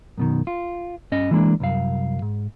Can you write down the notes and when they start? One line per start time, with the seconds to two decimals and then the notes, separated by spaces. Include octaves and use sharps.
0.18 F#2 B2 D#3
0.47 F4
1.12 G2 C#4 D#5
1.31 E3 G3 G#3 A#3 D4
1.60 C2 F#2 F5
2.22 G#2